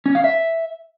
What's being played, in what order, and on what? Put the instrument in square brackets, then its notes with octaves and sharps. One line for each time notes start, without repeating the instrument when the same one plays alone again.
[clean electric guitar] C#4
F5
E5